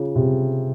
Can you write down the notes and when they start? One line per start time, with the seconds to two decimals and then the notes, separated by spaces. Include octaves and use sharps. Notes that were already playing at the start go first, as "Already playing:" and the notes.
Already playing: C#3 F4 G#4 C#5
0.15 C3